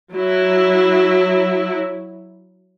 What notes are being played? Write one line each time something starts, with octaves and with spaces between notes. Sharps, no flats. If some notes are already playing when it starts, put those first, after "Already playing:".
F#3 E4